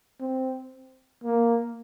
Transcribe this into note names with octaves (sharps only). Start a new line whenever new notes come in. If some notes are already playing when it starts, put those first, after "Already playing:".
C4
A#3